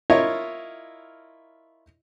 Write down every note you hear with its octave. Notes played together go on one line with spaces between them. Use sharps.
E4 F4 A#4 C#5 D#5 E5